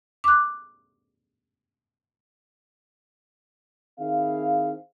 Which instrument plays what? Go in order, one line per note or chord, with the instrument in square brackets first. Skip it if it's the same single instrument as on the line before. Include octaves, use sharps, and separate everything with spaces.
[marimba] D6 F#6
[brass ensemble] D#3 C4 E4 G#4 F5